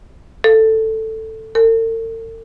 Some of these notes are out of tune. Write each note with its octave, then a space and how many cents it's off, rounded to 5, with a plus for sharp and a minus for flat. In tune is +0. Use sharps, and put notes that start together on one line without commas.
A4 +5
A4 +45